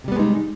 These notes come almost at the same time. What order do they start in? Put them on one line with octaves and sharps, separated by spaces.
C3 G3 B3 G#3 D#4